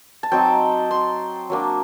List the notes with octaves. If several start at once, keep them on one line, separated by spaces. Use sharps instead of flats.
A5
F#3 C4 D#4 G5
C6
F#3 A#3 D4